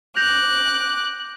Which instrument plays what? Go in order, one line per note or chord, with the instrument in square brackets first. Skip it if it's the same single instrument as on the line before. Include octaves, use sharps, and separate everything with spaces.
[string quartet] D6 F#6 [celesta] G6 A#6 F7